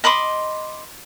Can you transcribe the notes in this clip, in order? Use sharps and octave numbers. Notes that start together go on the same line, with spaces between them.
D#5 B5 C6 D6